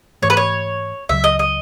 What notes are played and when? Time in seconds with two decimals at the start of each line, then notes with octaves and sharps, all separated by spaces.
0.22 G#2 E3 A3 C#5
0.30 B4
0.37 C#5
1.09 C#2 C#3 F#3 E5
1.24 D#5
1.39 D#5